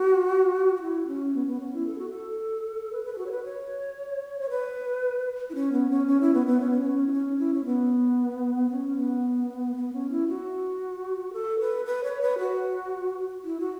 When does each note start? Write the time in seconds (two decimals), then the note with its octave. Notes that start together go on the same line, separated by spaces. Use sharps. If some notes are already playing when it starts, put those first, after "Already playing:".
Already playing: F#4
0.76 F#4
0.82 E4
1.07 C#4
1.35 B3
1.47 B3
1.60 C#4
1.74 E4
1.87 A4
1.98 F#4
2.10 A4
2.92 B4
3.05 B4
3.13 A4
3.18 F#4
3.26 C#5
3.31 B4
3.44 C#5
4.40 C#5
4.50 B4
5.50 E4
5.55 C#4
5.73 B3
5.90 C#4
6.07 C#4
6.21 E4
6.34 B3
6.46 B3
6.60 C#4
6.71 B3
6.81 C#4
7.07 E4
7.13 C#4
7.39 E4
7.54 C#4
7.65 B3
8.71 C#4
8.97 B3
9.76 B3
9.93 C#4
10.11 E4
10.28 F#4
11.33 A4
11.60 B4
11.86 B4
12.04 C#5
12.21 B4
12.39 F#4
13.44 E4
13.60 F#4